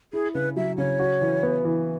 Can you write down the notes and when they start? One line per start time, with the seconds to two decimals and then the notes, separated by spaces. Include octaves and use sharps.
0.13 E4 G#4
0.34 C#3 B4
0.56 F#3 E5
0.78 C#3 C#5
0.99 F#4
1.21 E3
1.43 B3
1.65 E3